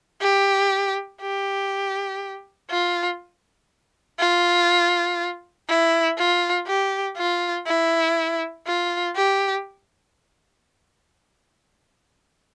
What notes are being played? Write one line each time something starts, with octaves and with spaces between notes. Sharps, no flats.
G4
G4
F4
F4
E4
F4
G4
F4
E4
F4
G4